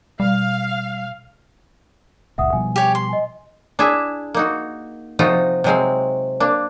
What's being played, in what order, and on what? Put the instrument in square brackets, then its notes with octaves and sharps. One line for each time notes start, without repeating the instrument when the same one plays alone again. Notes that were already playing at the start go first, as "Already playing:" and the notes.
[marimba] B2 [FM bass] G3 [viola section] F5
[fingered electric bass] F#1 C#2 A#2 [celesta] E5 F#5 D#6
[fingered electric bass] B2 F3 G3 [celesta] G#5
[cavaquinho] G4 C#5
C6
[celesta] D#5 G#5
[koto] D4 E4 G#4 E5
A#3 D#4 F#4
C3 F3 D#4 F4 F#4 A#5
C3 F#3 G#3 C4 F5
A#3 D4